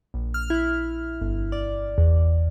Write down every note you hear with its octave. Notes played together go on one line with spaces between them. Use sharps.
A#1
F6
E4
G1
D5
E2